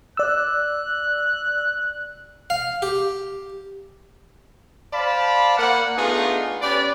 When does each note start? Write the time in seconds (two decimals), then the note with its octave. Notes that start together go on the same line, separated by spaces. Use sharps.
0.17 D5 E6 F#6
2.50 F5
2.82 G4
4.93 C5 D5 F5 A5 B5
5.57 A#3 F#5
5.98 A3 B3 D4 D#4 F4 G#4
6.62 C#4 G4 B4 D5